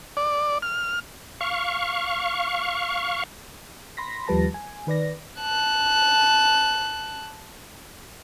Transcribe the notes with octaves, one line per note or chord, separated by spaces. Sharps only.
D5
F6
F5 C#6
B5 C6 A#6 B6
D#2 F3 G3 B4 A5 A#6
G#5
D#3 B4 D5 A#6
A5 F#6